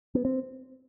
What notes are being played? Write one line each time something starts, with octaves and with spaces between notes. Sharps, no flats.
B3
C4